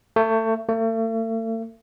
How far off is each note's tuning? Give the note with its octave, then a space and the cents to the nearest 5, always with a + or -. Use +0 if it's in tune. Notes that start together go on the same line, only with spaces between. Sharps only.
A3 +25
A3 +40